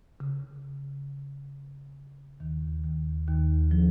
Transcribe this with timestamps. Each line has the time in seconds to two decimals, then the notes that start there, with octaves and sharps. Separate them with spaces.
0.20 C#3
2.40 D#2 D#3
2.84 D#2 D#3
3.27 D#2 D#3
3.71 F3